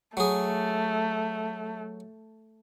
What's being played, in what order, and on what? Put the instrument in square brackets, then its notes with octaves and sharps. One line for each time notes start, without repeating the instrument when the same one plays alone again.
[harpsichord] F#3 G#4 [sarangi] A3